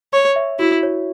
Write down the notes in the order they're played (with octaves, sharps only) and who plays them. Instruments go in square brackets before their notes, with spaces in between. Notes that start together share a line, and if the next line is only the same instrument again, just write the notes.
[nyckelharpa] C#5 [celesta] C#6
[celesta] E5
[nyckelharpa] E4 [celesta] F#4
[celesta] C#5